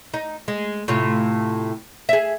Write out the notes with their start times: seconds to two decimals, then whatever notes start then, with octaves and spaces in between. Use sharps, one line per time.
0.14 D#4
0.48 G#3
0.88 A2 C3 F4
2.09 G#4 E5